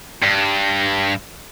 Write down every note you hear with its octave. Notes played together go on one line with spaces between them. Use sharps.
G2